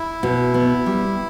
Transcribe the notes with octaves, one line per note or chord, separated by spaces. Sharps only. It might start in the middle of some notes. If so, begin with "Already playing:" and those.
Already playing: E4
B2
B3
G3